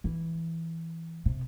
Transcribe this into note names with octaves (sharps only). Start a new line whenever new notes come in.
E3
C3